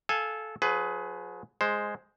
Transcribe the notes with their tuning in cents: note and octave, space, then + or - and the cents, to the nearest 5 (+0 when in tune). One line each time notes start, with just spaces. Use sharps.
A4 -15 F5 +0 G#5 +0
F#3 -45 G#4 +25 B4 +20
G#3 +0 C5 +5